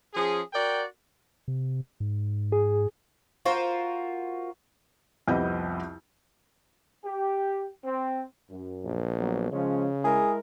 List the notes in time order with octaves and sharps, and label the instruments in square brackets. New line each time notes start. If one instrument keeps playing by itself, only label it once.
[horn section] F3 C#4 G#4
F#4 A#4 D5 F#5 G5
[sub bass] C3
G#2
[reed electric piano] G#4
[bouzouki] F4 F#4 A#4 C5
[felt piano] C2 F2 B3 G4 D#5 G6
[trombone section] G4
C4
F#2
[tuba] A#1
[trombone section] F#3 B3
[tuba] C#3 [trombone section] F3 G#3 C#4
[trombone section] G#3 E4 A#4 [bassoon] G#4